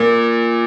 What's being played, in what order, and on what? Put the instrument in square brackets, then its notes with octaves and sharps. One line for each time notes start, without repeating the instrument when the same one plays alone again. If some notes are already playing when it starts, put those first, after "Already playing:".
Already playing: [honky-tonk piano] A#2